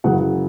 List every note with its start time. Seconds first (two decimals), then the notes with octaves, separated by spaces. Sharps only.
0.04 F#2 C#3 E3 F#5